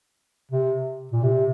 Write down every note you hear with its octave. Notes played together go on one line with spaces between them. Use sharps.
C3
A#2
C3